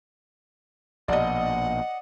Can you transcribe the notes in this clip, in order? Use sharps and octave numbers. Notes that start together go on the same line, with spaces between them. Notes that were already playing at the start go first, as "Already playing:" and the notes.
A#1 B2 D5 D#5 F#5